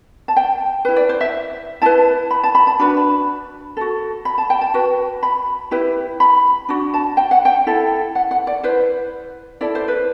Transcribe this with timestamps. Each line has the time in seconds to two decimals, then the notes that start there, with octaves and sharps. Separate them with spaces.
0.28 A5
0.36 G5
0.85 E4 B4
0.96 D5
1.09 C5
1.21 E5
1.82 E4 B4 A5
2.31 B5
2.43 A5
2.55 B5
2.67 A5
2.79 D4 F#4 B4 B5
2.97 B5
3.77 F#4 A4
4.25 B5
4.38 A5
4.50 G5
4.61 A5
4.74 F#4 B4
5.23 B5
5.71 E4 G4 B4
6.20 B5
6.69 D4 F#4
6.94 A5
7.17 G5
7.31 F#5
7.45 G5
7.67 E4 A4
8.15 F#5
8.31 F#5
8.47 D5
8.63 E4 B4 C5
9.61 E4 A4 D5
9.75 C5
9.88 B4